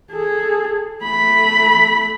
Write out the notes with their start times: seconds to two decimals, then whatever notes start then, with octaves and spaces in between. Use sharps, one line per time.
0.12 G#4 A4
1.03 A3 B5